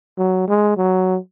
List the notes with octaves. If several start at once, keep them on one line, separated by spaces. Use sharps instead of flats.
F#3
G#3
F#3